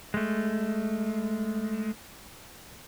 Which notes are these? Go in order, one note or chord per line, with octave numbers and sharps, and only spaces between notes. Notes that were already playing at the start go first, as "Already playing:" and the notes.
G#3 A3